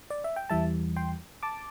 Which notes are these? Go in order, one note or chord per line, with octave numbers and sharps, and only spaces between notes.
D5
E5
G5
E2 E3 G3 E5 A5
G5 C6
A5 D6